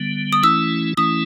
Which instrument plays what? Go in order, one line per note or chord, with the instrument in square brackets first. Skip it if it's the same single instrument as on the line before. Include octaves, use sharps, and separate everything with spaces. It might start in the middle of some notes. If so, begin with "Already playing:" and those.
Already playing: [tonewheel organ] D3 G3 B3
[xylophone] D#6
[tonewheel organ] E3 A3 C#4 E4 [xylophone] E6
[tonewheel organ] E3 A3 C#4 E4 [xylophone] D#6